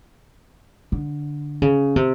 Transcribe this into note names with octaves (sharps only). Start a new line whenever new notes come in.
D3
C#3
C3